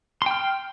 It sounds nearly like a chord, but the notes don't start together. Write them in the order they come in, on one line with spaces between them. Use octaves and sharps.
C6 G5 F6